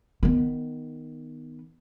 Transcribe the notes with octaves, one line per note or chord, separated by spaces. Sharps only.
D#3 B3